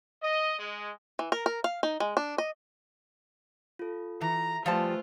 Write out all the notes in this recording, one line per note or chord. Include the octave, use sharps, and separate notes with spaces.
D#5
G#3
E3
A#4
A#4
F5
D#4
G#3
D4
D#5
F4 A4
E3 A#5
F3 G3 A3 F4 B4 C5 G#5 A5